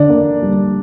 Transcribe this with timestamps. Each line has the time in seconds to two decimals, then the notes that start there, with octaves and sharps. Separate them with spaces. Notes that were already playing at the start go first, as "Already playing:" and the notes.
Already playing: D3 D4 D5
0.10 A#3
0.42 G3